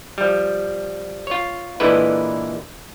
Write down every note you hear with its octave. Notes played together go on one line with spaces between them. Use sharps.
F3 G3
F4 C#5
A#2 D3 E3 G#3 E4 B4